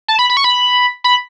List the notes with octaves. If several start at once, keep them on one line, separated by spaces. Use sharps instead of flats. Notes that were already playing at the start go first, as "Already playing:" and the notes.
A5
B5
B5
C#6
B5
B5